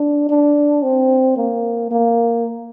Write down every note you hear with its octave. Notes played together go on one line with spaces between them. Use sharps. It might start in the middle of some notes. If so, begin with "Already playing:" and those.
Already playing: D4
D4
C4
A#3
A#3